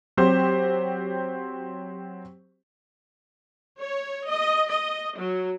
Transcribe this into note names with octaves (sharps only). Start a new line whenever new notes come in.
F#3 C4 G4 C5
C#5
D#5
D#5
F#3